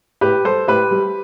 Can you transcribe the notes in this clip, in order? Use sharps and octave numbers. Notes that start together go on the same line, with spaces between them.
A2 G4 B4
G3 A4 C5
A2 G4 B4
G3